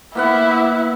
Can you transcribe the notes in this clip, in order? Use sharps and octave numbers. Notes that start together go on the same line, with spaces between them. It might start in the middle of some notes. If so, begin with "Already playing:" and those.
A#3 B3 E4 F#5